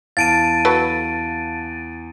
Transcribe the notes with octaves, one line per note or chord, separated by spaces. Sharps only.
E2 F5 A5 A6 D7 D#7
F#3 A4 B4